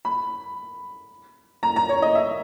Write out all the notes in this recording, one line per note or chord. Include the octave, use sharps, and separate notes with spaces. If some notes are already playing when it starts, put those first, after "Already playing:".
B5
A#5
A#5
C#5
D#5
E5